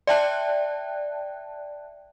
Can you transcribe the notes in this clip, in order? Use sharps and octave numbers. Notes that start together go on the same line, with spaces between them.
D5 E5 G5 A5 F#6